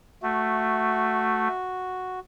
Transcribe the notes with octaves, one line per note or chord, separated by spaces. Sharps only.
A3 F#4